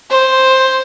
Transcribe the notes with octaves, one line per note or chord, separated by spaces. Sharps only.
C5